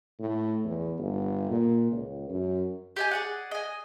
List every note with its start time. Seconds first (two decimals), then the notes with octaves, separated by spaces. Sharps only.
0.19 A2
0.65 E2
0.98 G1
1.50 A#2
1.91 C#2
2.29 F#2
2.96 G4 D#5 G#5
3.11 G#4 D5 F#5
3.51 D#5 G#5